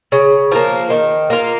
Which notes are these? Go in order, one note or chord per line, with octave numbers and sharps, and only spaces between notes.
C#3
F3 A#3
D#3
A#3 F4